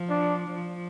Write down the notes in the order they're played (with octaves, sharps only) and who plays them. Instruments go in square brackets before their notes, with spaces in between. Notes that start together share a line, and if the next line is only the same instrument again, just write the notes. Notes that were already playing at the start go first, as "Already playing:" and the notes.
Already playing: [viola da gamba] F3
[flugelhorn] D4
[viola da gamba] F3